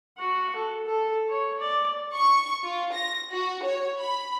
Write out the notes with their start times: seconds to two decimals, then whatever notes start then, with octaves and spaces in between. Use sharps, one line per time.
0.18 F#4 F#5
0.56 A4
0.86 A4
1.29 C#5
1.60 D5
2.15 C#6
2.64 F4
2.93 A#6
3.31 F#4
3.63 C#5
3.99 B5